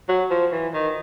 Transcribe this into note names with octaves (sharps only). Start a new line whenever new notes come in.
F#3
F3
E3
D#3